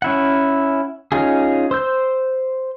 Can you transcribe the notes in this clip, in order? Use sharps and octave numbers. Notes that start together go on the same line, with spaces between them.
C#4 E4 F#5
C#4 D#4 F4 G#4
C5 E6 G6